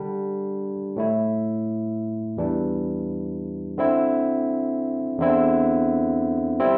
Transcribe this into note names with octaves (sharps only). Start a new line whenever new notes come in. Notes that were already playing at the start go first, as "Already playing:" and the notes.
Already playing: D3 G3 D4
A2 A3 E4
E2 E3 G3 D4
D3 C4 E4
E2 D3 C4 E4
G3 C4 E4